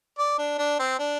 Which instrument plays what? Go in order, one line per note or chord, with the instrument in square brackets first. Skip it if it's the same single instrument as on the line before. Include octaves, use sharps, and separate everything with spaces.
[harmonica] D5
D4
D4
C4
D4